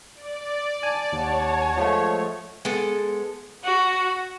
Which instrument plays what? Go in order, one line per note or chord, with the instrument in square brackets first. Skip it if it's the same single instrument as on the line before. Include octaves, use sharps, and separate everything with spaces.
[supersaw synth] D5
[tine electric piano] G#5 [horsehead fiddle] A5
[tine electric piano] D#2 [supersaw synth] C#5 [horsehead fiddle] F#5 A5
[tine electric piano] F3 G#3 A3
[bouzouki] G#3 B3 A4
[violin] F#4